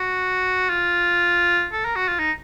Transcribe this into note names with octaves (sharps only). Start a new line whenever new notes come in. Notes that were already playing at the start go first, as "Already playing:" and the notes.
Already playing: F#4
F4
A4
A#4
F#4
F4
D#4